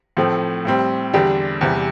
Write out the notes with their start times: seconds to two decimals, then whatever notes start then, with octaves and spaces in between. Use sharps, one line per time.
0.17 A2 F3 A3 C4
0.65 A2 G3 C4
1.13 E2 D3 G3 D4 G4
1.61 E2 C3 E3 G3